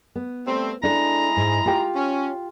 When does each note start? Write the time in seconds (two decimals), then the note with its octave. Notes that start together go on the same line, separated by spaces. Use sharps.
0.15 B3
0.48 G3 A3 C4
0.83 G#3 D4 E4 A4 A#5
1.37 G#2
1.66 F4 G4 G5
1.96 C#4